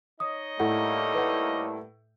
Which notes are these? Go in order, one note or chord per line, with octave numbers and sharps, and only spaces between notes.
D#4 C#5 D#5 D#6
A2 G3 A3 A#3 F#5
B4 F#5